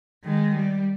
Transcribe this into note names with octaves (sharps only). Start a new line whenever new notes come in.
D#3 G#3
G3